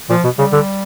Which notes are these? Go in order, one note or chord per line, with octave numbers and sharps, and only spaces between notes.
A#2 F3
B2
C#3 G3
D3